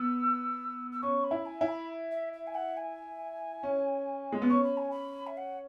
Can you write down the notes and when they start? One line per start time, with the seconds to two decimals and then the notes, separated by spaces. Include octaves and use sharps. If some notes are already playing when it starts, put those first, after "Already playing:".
Already playing: B3 E6
0.92 E6
1.02 C#4 C#6
1.24 B5
1.31 E4
1.46 G#5
1.61 E4
1.68 B5
2.11 E5
2.33 E5
2.47 G#5
2.55 F#5
2.77 G#5
3.63 C#4
4.32 G#3
4.42 B3
4.49 C#4 C#6
4.64 B5
4.77 G#5
4.91 B5
5.27 E5
5.37 F#5